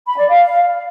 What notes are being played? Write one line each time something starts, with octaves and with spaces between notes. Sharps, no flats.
B5
D5
F5